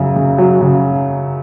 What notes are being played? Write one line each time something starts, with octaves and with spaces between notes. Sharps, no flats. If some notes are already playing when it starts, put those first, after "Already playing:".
Already playing: F#2 C#3 F#3
C#3
F#3
C#3